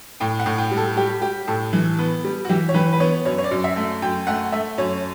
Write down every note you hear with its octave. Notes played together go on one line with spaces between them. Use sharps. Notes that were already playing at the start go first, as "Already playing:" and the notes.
A2 G5
F#5
A2
G5
G3
A4
G3 G4
G3 G4
A2 A4
E3
B3
G3
F#4
E3 G4
C#5
E3 B4
B4
B3 C#5
F#2 C#5
C#5
D5
F#2
E5
A3
F#2 G5
A3 F#5
A3 E5
F#2 C#5